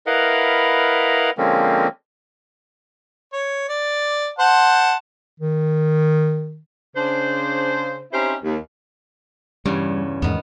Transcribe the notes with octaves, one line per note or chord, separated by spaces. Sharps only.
E4 A#4 B4 D#5 F5 F#5
D3 F3 G#3 A#3 C4 C#4
C#5
D5
C5 F#5 A5
D#3
C#3 D4 C5
C4 C#4 D#4 E4 G4 C5
D#2
E2 G2 C#3 G3
E2 G#2 D#3 B3